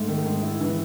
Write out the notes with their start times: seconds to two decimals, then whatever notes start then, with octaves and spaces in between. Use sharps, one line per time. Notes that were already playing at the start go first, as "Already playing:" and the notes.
Already playing: G#2 A3
0.08 D#3
0.25 G#2
0.43 E4
0.60 E3